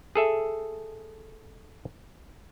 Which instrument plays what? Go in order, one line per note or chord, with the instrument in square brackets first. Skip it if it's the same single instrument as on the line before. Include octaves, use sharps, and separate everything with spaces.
[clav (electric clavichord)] G#4 A4 E5